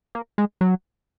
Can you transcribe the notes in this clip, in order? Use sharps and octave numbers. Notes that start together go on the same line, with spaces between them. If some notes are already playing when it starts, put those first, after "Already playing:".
A#3
G#3
F#3